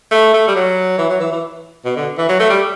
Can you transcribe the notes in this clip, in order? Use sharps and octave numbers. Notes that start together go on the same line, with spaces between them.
A3
A3
G3
F#3
E3
F#3
E3
E3
B2
D3
E3
F#3
A3
G3